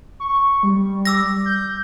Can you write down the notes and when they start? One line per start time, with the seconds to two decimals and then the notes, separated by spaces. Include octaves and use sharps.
0.20 C#6
0.63 G3
1.05 D6 E6 A#6
1.45 G6